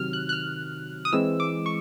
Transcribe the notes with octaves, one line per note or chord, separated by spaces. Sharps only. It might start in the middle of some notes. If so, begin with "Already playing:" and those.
Already playing: C3 D#3 F#3 F6
F#6
F#6
F6
D#6
E3 G#3 C4 E6
D6
C#6